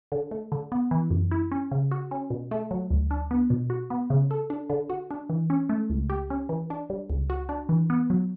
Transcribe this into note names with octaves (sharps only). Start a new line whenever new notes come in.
D3
A3
D3
B3
E3
F#2
E4
C#4
C#3
F#4
C#4
B2
A3
F#3
D2
D4
B3
B2
F#4
B3
C#3
A4
D4
D3
F#4
D4
E3
C#4
A3
C#2
G4
C#4
E3
D4
G3
C#2
F#4
D4
E3
B3
F#3